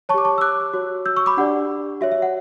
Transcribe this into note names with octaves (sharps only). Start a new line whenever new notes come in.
C#5 A5 C#6
G4 D6
A5 C#6
E6
D6 F#6
F#4 C#5
E6 G6
C#6 E6
B5 D6
D4 G4 D5 F#5
F#4 C#5 E5
E5
F#5